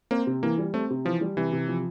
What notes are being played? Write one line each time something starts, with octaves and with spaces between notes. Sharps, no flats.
A#3 C4
C3
E3 A#3
G3
A3 C4
C3
E3 F3
G3
C3 E3
C3
F3